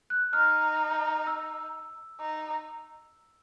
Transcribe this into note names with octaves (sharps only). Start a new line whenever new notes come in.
F#6
D#4 F6
E6
D#4